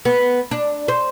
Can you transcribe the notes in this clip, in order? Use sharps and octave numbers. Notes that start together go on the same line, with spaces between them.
B3
D4
C5